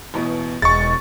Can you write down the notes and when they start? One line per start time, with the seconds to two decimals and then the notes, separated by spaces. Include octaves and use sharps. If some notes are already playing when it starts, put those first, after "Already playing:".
0.14 A1 E2 B2
0.62 E1 G#3 C#6 A6